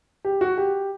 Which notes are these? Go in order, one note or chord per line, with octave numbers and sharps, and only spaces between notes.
G4
F#4
G4